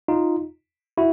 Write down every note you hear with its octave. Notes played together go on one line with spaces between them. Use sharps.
D#4 F4
E4 F#4